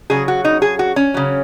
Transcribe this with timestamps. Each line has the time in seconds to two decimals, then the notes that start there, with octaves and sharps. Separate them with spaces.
0.10 C#3 F#3 G#4
0.28 F#4
0.45 D#4
0.62 G#4
0.79 F#4
0.96 C#4
1.14 C#3 F#3